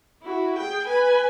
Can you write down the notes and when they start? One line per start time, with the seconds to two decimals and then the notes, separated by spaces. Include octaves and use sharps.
0.22 E4 F#4
0.58 G#4 G5
0.88 B4 G#5